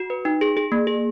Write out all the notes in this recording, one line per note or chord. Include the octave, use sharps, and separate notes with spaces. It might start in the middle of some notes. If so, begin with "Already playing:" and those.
Already playing: F#4
B4
D#4
G#4
G#4
A#3
G#4